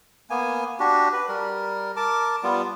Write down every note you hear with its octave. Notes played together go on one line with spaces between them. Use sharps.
A#3 B3 G#5
D4 F#4 G4
B4
G3 A#4
A#4 A5 D6
G3 B3 F4